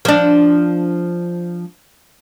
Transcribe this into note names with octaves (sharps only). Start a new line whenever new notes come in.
F3 D4